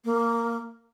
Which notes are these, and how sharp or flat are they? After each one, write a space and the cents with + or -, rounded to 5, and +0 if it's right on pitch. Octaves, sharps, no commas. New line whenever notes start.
A#3 -5